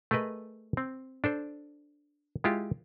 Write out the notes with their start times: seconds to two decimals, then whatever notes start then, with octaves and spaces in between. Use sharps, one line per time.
0.11 A3 G#4 A#4 B4 D#5
0.77 C4
1.24 D4 A4 C5
2.44 G#3 E4 F4 G4